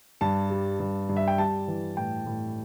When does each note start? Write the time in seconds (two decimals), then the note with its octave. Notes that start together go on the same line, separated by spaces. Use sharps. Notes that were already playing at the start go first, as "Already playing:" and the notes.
0.21 G2 A5
0.50 G3
0.80 G2
1.09 G2
1.16 E5
1.28 G5
1.38 G3 A5
1.68 E3
1.97 A2 G5
2.26 A2